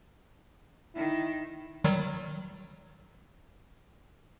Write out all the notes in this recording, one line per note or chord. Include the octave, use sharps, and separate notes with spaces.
D#3 E4
D#3 F#3 G3